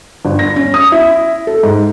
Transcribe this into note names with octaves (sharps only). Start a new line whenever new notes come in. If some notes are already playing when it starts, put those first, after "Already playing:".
G1
A#6
C#4
D#6
E4
A4
G#2